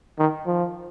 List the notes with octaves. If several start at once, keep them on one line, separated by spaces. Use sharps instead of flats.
D#3
F3